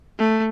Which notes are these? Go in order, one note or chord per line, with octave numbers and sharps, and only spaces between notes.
A3